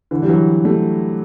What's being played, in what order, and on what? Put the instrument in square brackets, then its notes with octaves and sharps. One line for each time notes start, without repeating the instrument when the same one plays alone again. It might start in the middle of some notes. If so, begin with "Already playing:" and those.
[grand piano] D3 E3
G3
E3 F#3
G3 A3